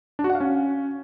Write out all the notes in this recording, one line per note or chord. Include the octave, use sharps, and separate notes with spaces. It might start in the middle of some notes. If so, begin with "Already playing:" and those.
D4
F#4
F#5
F5
C#4